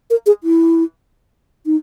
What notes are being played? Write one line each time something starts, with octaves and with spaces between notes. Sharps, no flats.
A#4
G#4
E4
D#4